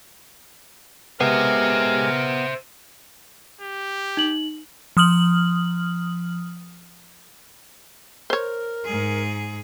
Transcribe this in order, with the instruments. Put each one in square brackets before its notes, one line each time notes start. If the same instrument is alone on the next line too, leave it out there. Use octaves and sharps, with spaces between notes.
[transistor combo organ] G#3 G4 G#5 [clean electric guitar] B3 [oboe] A#4 [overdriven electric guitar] C5 E5
[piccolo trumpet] G4
[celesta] D#4 F#7
[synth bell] F3 D#6 F6 F#7
[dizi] A#4 [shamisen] C5 C#5
[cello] G#2 G#4